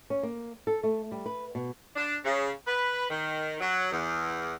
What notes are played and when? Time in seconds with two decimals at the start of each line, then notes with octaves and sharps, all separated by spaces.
0.10 C#4
0.23 A#3
0.67 A4
0.83 A3
1.12 G3
1.26 B4
1.55 B2
1.96 D4
2.25 C#3
2.67 B4
3.10 D#3
3.61 F#3
3.91 E2